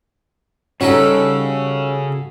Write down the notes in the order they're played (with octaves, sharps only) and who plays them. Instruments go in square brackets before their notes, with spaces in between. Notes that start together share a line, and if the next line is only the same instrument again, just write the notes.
[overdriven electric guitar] C#3 [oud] G3 D#4 [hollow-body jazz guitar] C#4 [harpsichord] F#4 A4